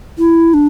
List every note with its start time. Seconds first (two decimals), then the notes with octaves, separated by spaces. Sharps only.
0.19 E4
0.54 D4